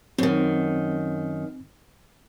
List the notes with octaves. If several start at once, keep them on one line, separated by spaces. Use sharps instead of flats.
F#2 D#3 C4